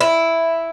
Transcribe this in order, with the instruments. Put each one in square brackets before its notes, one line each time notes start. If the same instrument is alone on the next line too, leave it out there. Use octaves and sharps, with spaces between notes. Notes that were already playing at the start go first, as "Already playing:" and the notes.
[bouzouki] E4